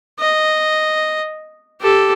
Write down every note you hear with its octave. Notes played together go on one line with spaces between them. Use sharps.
D#5
G4 A4